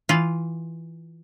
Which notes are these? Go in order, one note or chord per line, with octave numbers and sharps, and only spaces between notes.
E3 F4